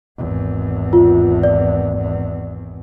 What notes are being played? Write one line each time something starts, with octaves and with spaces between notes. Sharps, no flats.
G#1 E2
F4
D5